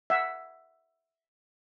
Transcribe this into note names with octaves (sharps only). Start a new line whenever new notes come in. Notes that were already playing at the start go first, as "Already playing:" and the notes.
E5 F#5